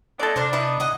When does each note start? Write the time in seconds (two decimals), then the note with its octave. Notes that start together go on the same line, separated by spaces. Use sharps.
0.19 G#3 A3 B3 A4 D5
0.36 C3 D4 F#4 A#4 C5
0.53 B3 D#4 E4 B4
0.80 C#3 D#5 F#5 A#5